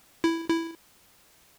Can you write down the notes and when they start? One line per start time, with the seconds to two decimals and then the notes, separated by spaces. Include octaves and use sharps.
0.24 E4
0.50 E4